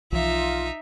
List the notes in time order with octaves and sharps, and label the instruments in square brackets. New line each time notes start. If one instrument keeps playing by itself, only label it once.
[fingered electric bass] B1 E3 F3 [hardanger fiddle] D#4 E5 [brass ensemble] F4